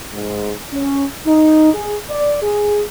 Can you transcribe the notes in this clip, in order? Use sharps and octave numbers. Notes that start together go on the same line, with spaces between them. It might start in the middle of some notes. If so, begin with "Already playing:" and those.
G#2
C#4
D#4
G#4
D5
G#4